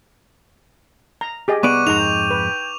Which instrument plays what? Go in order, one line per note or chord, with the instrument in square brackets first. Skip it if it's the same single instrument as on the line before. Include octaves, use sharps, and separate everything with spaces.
[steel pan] A#5
G4 G#4 D#5
[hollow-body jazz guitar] C2 B3 D5 [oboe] F#5 [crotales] C#6 D6 D#7
[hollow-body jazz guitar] F2 G#2 G#3 [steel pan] D#4 A#5 [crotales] F7
[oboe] G5
[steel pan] B4